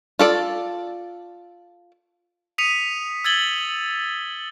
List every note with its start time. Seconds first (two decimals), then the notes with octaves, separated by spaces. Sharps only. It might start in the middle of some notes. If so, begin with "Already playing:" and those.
0.19 F4 A4 D5
2.58 D#6 B6 C#7 D#7 F7
3.24 E6 G#6 A6 F#7 G7